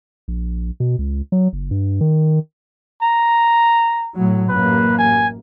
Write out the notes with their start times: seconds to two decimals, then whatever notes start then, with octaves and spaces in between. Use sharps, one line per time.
0.28 A#1
0.80 B2
0.99 C#2
1.32 F#3
1.53 F#1
1.71 G2
2.01 D#3
3.02 A#5
4.15 A2 F#3
4.49 A1 F#2 A#3 B4
4.99 G#5